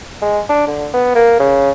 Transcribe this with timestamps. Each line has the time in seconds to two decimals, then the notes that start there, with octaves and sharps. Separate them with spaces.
0.22 G#3
0.49 D4
0.67 D3
0.94 B3
1.15 A#3
1.39 C#3